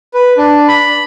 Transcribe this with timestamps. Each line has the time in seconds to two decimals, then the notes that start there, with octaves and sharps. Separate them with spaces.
0.14 B4
0.38 D4
0.68 B5